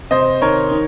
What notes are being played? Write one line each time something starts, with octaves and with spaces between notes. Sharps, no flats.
C3 C5 D#5
D#3 A#4 C#5
D#3